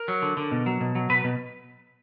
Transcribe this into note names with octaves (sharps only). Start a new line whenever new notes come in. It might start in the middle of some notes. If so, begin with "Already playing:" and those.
Already playing: A#4
F#3
D3
D3
B2
F#3
B2
F#3
B2 B4
B2